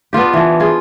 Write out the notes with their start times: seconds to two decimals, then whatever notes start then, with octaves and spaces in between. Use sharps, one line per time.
0.13 B3 D4 F4 G4
0.33 E3 F3
0.60 F4 G#4